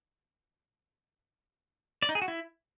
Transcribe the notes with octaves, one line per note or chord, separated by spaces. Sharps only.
D5
D#4
G#4
F#4
E4